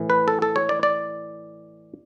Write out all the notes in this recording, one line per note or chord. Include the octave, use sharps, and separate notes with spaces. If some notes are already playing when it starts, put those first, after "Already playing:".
Already playing: A2 E3
B4
A4
A4
C#5
D5
D5